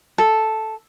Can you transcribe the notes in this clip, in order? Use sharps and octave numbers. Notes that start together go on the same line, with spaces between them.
A4